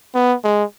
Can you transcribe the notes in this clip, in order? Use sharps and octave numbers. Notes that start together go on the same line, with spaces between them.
B3
G#3